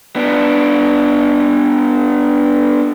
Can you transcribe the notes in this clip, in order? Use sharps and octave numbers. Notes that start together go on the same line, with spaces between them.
B3 D4